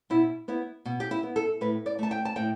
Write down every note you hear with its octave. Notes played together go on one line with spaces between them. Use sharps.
B2 E4
B3 E4
B2
G4
E4
B3
A4
A2 B4
D5
A3 A5
G5
A5
A2 G5